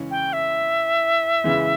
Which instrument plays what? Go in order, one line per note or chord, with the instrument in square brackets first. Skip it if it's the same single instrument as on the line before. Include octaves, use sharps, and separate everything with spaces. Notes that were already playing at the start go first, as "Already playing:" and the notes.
Already playing: [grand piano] C#3 E3 G#3 C#4 G#4
[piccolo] G5
E5
[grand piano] C#3 E3 G#3